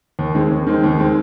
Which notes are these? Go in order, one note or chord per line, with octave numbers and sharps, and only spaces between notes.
D#2
D#3 G#3 C4
D#2
D#3 G#3 C4
D#2
D#3 G#3 C4